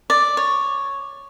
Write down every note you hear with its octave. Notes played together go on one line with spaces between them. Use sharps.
D5
C#5